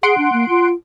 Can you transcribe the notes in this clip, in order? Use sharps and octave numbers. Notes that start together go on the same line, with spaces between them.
G#4 F#5 C6 D7
D4
A#3
F4